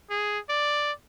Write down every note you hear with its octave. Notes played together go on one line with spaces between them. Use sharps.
G#4
D5